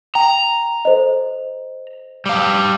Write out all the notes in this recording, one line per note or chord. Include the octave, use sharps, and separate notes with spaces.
G5 A#5
A4 C5 D#5
G3 F5